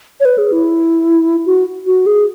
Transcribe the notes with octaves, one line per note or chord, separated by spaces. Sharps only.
C#5
B4
G#4
E4
F#4
F#4
G#4